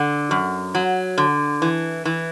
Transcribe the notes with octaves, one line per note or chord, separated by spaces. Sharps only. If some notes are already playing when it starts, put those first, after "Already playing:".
Already playing: D3
F#2
F#3
D3
E3
E3